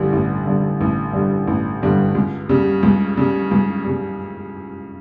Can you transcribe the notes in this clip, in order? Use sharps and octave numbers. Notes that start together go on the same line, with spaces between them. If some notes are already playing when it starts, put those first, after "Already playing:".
Already playing: A1 G2 D3 G3
A1
G2 D3 G3
A1
G2 D3 G3
A1
G2 D3 G3
C#2
C#3 G3
C#2
C#3 G3
C#2
C#3 G3